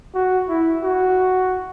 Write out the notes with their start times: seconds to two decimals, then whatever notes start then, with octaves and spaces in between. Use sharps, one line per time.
0.14 F#4
0.48 E4
0.83 F#4